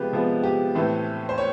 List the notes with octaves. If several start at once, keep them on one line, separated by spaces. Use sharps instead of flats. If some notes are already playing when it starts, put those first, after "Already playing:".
Already playing: C3 F3 G#3 B3 G4 B4
C3 F3 G#3 B3
G4
A2 E3 A3 C4
C5
C#5